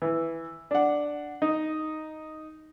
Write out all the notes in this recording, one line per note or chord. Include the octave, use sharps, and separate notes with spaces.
E3
D4 F#5
D#4